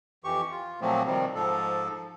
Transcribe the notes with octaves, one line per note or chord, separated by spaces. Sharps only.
F2 E3 G4 C#6
F4
A#2 F3 F#3 A3 A#3 C4
C3 D#3 F3 G3 C4
G#2 F3 A4